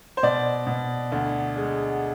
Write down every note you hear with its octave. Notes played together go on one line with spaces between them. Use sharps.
C5
B2 D5
B2
D2
G#3